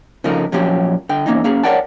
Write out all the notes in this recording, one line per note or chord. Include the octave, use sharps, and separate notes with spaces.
C#3 F3 A3 D#4 A#4
A#2 F3 F#3 C#4 G4
D3 G5
E2 A#3 C#4 D#4
A#3 C#4 G#4
A#4 C#5 D5 F#5 G5 A5